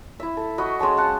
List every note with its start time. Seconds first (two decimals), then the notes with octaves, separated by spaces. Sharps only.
0.20 E4 E5
0.37 A4
0.58 F#4 D#5 B5 C#6
0.79 G#3 C#4 A5 C6
0.97 F5 F#5 A5